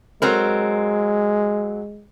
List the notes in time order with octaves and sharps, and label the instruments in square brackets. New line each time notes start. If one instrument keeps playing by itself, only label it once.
[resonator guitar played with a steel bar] F#3 C4 A#4 [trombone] G#3